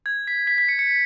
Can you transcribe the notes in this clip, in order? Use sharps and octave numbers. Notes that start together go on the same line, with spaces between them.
G#6
B6
B6
B6
C#7
C#7